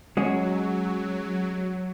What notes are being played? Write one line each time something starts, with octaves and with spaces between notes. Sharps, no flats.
F#3 G#3 C#4 F#4